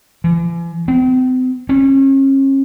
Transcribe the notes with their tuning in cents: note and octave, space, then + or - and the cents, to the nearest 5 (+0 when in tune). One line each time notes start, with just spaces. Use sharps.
E3 +45
C4 -40
C#4 -35